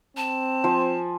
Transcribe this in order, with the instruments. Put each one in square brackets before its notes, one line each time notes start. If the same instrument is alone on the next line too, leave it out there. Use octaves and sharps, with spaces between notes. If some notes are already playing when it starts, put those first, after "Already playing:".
[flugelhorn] C4 [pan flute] A5
[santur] F3 G#5